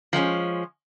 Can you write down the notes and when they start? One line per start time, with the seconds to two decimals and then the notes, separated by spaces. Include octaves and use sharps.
0.13 F3 G#3 B3 C#4